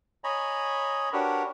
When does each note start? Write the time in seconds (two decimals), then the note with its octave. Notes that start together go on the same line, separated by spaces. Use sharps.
0.24 C#5 D#5 G#5 A#5 B5
1.13 D4 F#4 G4 A#4 B4 C#5